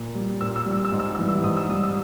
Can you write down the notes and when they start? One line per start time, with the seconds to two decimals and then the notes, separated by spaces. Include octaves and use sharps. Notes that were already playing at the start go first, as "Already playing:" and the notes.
Already playing: A#2
0.15 G3
0.41 A#2 E6
0.56 E6
0.66 G3 E6
0.85 E6
0.92 G#2
0.99 E6
1.15 E6
1.18 E3 G3
1.28 E6
1.44 G#2 D#6
1.57 E6
1.69 G3 D#6
1.83 E6